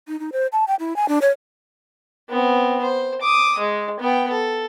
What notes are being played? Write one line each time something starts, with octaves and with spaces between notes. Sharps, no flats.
D#4
D#4
C5
A5
G5
E4
G#5
D4
C#5
B3 C4
C5
D6 D#6
G#3
B3 G5
A4